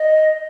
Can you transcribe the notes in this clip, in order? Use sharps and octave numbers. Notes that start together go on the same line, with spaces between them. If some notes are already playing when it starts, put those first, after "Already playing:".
Already playing: D#5